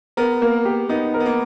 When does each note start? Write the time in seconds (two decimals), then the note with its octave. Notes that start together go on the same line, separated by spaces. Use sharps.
0.17 B3 A#4
0.42 A#3
0.65 G4
0.89 B3 D#4
1.14 A#4
1.20 B3
1.26 A#3